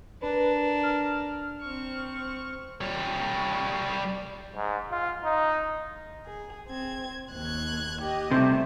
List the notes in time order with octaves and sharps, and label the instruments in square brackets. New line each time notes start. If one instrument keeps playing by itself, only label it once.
[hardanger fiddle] D4 A#4 [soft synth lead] B4
[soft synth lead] F6
[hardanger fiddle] C4 C#6
[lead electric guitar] G3 C#5
[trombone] G#2
F4
D#4
[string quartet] G#4
C4 G#6
D#2 F#6 G#6
G4 D#5
[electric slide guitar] C3 [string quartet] G3 A3